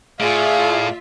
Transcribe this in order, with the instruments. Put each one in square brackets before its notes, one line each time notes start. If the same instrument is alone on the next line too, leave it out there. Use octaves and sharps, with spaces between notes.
[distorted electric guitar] A2 [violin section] F4 E5 [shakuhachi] G#4 [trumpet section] D5 F5